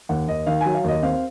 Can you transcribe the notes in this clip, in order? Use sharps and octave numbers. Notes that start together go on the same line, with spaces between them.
D#2 F#5
D#2 D#5
D#3 F5
F#3 G#5
F5
D#2 D#5
C4 F5